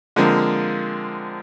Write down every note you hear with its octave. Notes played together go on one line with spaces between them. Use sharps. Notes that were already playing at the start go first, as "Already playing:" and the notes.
D3 F3 G#3 A#3 C4